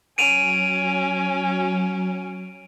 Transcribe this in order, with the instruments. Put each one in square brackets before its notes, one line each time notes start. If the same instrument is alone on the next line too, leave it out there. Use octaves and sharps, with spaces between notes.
[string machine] F#3 [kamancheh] C#4 G#5 [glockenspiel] D7 D#7 F7